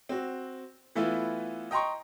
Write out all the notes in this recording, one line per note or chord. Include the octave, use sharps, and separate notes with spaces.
C4 F#4
E3 A3 B3 E4 F4
D#5 G5 A#5 C6 C#6